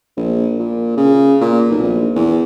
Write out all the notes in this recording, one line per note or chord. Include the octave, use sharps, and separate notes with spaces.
A#1
A#2
C#3
A#2
B1
A#1
E2